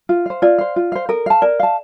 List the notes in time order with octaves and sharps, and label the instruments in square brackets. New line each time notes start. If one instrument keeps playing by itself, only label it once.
[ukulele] F4
C5 F5
[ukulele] F4 [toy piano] D5
[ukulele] C5 F5
F4
C5 F5
[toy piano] A4 [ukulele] A#4
[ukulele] F5 A5
[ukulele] A#4 [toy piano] D5
[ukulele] F5 A5